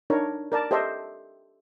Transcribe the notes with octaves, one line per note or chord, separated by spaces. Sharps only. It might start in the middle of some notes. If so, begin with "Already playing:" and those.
D4 D#4 A#4 C#5
A#4 D5 A5
G4 A4 C5 D#5 E5